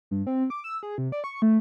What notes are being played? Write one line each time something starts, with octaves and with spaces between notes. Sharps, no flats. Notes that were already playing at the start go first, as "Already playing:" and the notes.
G2
C4
D6
E6
G#4
C3
D5
C#6
A3